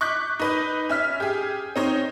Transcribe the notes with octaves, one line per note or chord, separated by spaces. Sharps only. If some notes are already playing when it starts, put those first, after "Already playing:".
C#6 D6 F#6 G6 B6
D#4 B4 D#5
C#4 E5 F6 B6
G4 G#4
C4 D#4 C#5